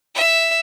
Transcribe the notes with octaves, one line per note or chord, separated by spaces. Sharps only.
E5